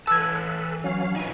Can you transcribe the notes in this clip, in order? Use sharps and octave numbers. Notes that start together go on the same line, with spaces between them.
E3 A4 B4 A5 E6 G#6
F#3 C#4 F5
D#4 F4 B4 G#5